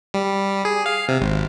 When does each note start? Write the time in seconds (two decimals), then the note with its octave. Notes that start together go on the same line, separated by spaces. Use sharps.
0.14 G3
0.65 G#4
0.86 F5
1.09 C3
1.20 G#1